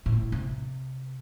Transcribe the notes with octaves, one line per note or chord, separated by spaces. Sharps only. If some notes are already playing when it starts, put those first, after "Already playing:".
A2
C3